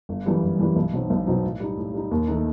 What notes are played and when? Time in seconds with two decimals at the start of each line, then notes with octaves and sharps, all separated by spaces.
0.09 G1
0.26 F#2 E3 G3
0.43 G1
0.60 F#2 E3 G3
0.76 B1
0.93 B2 F#3 C4 D#4
1.10 B1
1.27 B2 F#3 C4 D#4
1.44 A2
1.60 G3 D#4
1.77 A2
1.94 G3 D#4
2.11 D#2
2.28 D#3 A3 D#4